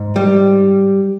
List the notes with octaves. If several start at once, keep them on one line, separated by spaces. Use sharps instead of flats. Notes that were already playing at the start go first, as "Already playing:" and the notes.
Already playing: G#2
G3